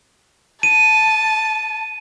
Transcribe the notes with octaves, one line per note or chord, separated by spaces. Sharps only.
A5 D#7